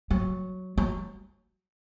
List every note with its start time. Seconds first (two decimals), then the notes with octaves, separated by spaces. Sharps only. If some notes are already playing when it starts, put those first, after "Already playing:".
0.11 F#3
0.78 F#3